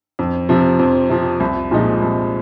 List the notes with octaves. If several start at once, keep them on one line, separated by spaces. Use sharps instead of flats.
F2
C3 F3
F2
C3 F3
C2
A#2 F3 G#3 D#4
C2